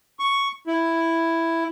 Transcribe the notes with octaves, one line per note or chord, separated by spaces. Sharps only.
C#6
E4